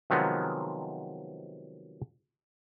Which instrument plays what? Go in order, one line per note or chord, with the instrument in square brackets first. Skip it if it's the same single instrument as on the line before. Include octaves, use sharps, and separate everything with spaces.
[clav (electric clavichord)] C3 D#3 F3 F#3 G#3 B3